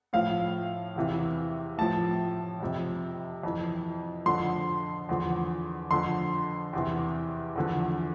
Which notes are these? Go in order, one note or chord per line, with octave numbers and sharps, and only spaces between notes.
A2 F3 F5
E2 C3 E3
A2 F3 A5
F2 C3 F3
F2 E3
F2 D3 F3 C6
E2 D3 F3
F2 D3 F3 C6
E2 C3 E3
E2 D3 F3